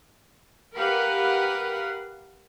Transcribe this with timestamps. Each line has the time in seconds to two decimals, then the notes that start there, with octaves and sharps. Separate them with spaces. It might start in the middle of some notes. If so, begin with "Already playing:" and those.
0.75 G4 A#4 B4 F5 F#5